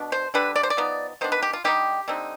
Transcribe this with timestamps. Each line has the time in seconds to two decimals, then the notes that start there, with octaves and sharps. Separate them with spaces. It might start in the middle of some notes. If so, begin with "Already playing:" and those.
Already playing: B2 D4
0.12 C5
0.34 D3 G3 D4 B4
0.56 D5
0.63 C5
0.70 D5
0.77 F3 B3 D#4
1.21 D#3 B3 D4 C5
1.32 B4
1.43 G4
1.53 F4
1.64 D3 G3 C4 D#4 G4
2.08 D3 G3 C4 D#4